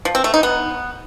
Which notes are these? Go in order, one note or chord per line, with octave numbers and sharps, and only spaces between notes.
F3
C4
A3
D#4
B3